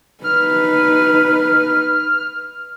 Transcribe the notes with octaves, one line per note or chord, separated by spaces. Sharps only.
D#4 B4 F6